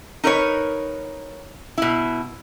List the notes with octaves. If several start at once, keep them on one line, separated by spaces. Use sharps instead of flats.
D#4 A#4 B4 C#5
B2 E4